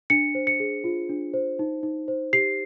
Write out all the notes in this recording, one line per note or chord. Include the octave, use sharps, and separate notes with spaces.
D4 C#7
C5
C#7
G#4
F4
D4
C5
D#4
D#4
C5
G4 C7